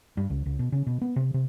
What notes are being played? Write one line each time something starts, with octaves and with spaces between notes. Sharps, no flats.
G2
C#2
C#2
B2
C#3
B2
B3
C3
C3